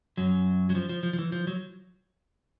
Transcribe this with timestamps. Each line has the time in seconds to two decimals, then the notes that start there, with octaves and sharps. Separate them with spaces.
0.17 F#2 F#3
0.70 F#3
0.75 F3
0.89 F3
1.03 F3
1.13 F3
1.19 E3
1.32 F3
1.47 F#3